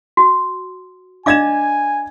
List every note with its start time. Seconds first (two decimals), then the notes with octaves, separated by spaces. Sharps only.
0.17 F#4
1.26 D4 D#5 F5 G#5 D6 G#6 E7